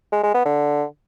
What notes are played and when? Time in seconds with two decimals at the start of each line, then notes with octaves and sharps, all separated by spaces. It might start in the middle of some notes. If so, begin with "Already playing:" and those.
0.12 G#3
0.23 G#3
0.34 B3
0.46 D3